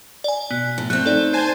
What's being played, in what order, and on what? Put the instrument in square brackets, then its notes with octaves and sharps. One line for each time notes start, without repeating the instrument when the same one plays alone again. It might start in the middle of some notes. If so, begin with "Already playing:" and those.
[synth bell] D5 G#5
[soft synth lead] B2 [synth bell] B3
[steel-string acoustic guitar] A2
[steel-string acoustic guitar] A3 C4 [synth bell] F#6
[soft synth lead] D#4 [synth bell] A4 D5
[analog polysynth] C5 G#5 A5